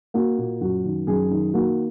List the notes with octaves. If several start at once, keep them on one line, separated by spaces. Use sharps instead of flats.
A#3 F#4
A#2
F#2 F#4
D#3
F#2 G#4
D#3
A#3 F#4